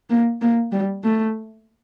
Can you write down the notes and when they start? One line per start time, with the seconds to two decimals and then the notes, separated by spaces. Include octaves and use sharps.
0.10 A#3
0.42 A#3
0.72 G3
1.04 A3